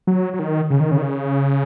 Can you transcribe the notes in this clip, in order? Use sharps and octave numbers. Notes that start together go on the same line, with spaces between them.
F#3
F#3
D#3
C#3
D#3
C#3
D#3
C#3